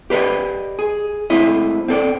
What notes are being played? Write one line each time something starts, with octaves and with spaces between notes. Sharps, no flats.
G4 B4 D5 D#5
G#4
G#3 A3 C4 E4 D#5
C4 A4 D5